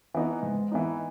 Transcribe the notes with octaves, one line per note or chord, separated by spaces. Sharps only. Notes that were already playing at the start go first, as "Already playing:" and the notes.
E3 B3 D#4
G#2
E3 B3 D#4